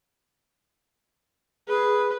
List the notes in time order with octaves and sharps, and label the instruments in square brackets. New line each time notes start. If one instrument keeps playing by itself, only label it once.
[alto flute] G#4 [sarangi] B4